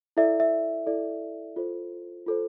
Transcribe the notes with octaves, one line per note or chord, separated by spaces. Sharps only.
E4 A4 D5 E5
E5
E4 A4 D5
F4 A4 C5
F4 A4 C5